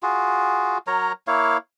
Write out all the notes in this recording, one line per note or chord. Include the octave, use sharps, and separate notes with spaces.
F4 F#4 G#4
F#3 A#4 C#5 A#5
A#3 E4 C#5 F5